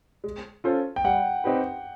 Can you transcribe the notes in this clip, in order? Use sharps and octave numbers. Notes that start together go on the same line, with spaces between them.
G#3
C#4 F4 A4 C5
G5
G3 F#5
C4 D#4 G4 B4